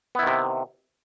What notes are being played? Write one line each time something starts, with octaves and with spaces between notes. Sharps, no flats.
C3 D#3 B3 E4